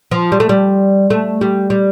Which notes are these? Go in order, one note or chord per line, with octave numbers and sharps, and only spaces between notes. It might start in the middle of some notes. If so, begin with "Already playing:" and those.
F3
G3
A3
G3
A3
G3
G3